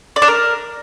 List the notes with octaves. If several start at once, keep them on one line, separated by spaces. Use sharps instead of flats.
D5
D4
A#4